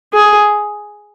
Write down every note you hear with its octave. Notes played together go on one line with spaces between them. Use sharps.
G#4